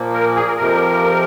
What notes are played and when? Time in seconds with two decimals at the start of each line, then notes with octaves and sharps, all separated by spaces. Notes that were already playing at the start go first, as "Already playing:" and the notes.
Already playing: A#2 F3 A#3
0.13 A#4
0.36 G#4
0.47 A#4
0.57 F2 C3 F3 A#4